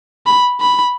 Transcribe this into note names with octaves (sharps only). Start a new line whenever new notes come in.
B5
B5